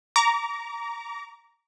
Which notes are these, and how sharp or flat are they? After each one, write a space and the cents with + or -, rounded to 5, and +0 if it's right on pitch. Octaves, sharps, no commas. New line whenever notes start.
A#5 +0 D6 -35